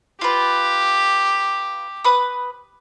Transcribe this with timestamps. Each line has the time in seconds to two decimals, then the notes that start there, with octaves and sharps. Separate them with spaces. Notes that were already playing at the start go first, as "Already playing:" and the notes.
0.21 F4 G4 B4
2.04 B4 B5 D#6